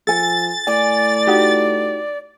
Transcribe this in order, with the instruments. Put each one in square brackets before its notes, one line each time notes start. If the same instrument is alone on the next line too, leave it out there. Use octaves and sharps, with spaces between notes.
[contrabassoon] F3 [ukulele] A4 G#5 [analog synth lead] A6
[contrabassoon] A2 [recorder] D5 [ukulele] G#5
[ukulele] D#4 F#4 G4